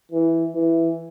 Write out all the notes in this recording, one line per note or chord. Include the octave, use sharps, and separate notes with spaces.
E3
E3